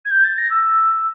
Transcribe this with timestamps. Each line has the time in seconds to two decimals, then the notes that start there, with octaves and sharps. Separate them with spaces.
0.05 G#6
0.11 G6
0.24 A6
0.38 A#6
0.50 E6